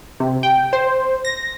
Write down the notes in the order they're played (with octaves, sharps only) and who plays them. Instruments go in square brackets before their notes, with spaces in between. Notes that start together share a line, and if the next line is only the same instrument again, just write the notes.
[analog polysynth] C3
G5
C5
A#6